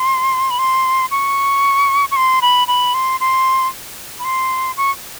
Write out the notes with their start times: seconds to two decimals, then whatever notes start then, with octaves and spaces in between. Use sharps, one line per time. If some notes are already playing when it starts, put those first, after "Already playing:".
Already playing: C6
0.51 B5
0.59 C6
1.11 C#6
2.11 C#6
2.16 C6
2.42 B5
2.68 B5
2.94 C6
3.20 C6
4.19 B5
4.25 C6
4.77 C#6